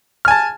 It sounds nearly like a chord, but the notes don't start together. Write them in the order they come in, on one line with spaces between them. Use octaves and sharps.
F6 G#5 A5